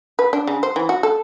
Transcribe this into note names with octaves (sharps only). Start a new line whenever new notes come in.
B4
D4
C#3
C5
E3
F#4
A4